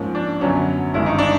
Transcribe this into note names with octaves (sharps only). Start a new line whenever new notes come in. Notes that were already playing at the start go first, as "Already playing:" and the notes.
Already playing: G#2 F3 A#3 C#4
D4
F#2 D3 F#3 B3 C#4
G#1 G2 D#3 G#3 C#4 E4
D#4
D4